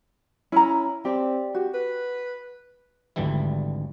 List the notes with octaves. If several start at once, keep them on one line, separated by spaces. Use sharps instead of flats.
C#4 E4 A#5
C4 G4 D5 G5
F#4 G4
B4
G#1 D2 D3 E3 G3 E4